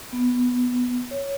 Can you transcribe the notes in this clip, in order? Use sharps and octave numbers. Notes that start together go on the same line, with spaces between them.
B3
C#5